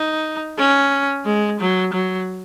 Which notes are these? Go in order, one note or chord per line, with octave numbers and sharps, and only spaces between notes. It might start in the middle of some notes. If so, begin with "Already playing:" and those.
Already playing: D#4
C#4
G#3
F#3
F#3